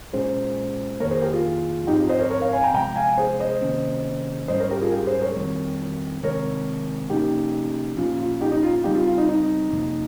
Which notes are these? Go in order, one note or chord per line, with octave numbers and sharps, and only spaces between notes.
A#2 G#3 C#4 G#4 C5
F2 D#3 A#3 A#4 C#5
G#4 C5
G4 A#4
F4 G#4
G#2 F3 C4 D#4 G4
F4
C5 D#5
A#4 C#5
A#4 C#5
C#5 F5
F5 G#5
G5 A#5
C3 F3 G#3 G5 A#5
F5 G#5
G#4 C5
C5 D#5
C3 D#3 A#3 C#4
G#2 G3 C#4 C5 D#5
A#4 C#5
G4 A#4
F4 G#4
G4 A#4
G#4 C5
A#4 C#5
F2 D#3 G3 C4
C3 D#3 G#3 C4 A#4 C#5
C3 F3 A#3 C#4 D#4 G4
A#2 F3 A#3 C#4 F4
F4
D#4 G4
D#4
F4
F4
C#3 G3 C4 D#4 G4
F4
F4
D#4
D#4
F2 C3 F3 A#3